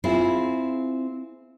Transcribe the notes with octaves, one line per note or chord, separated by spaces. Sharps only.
C4 E4 F4 G#4